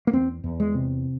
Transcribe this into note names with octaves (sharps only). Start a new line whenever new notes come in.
A#3
E2 C4
E2
G#3
C3